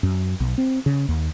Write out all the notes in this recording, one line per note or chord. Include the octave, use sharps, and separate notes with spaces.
F#2
B1
C4
C#3
D#2